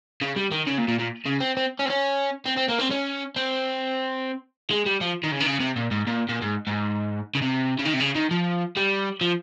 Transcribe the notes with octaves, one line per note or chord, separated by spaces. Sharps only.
C#3
G3
D#3
C#3
A#2
A#2
A#2
C#3
C4
C4
C#4
C4
C#4
C4
C4
A#3
C4
C#4
C4
G#3
G3
F3
D#3
C#3
D#3
C#3
C3
A#2
G#2
A#2
A#2
G#2
G#2
C#3
C3
C#3
D#3
C3
C#3
D#3
F3
G3
F3